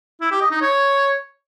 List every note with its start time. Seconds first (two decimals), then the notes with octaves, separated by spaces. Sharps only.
0.21 E4
0.31 G4
0.41 D#5
0.51 D#4
0.61 C#5